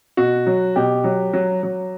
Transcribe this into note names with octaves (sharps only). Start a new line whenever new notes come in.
B2 F#4
F#3
B2 G4
F#3
F#3
F#3